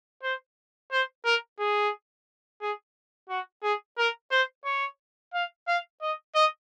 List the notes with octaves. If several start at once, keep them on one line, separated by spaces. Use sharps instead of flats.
C5
C5
A#4
G#4
G#4
F#4
G#4
A#4
C5
C#5
F5
F5
D#5
D#5